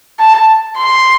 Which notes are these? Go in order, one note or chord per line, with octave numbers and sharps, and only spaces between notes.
A5
C6